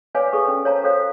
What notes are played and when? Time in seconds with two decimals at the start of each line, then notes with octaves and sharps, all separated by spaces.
0.15 B4 C#5 D5 F5 G#5 D6
0.33 G#4 A4 B4 C#6
0.48 C#4
0.64 A#4 C5 C#5 F5 A5 A#5
0.84 F#4 A4 C5 C#5 F5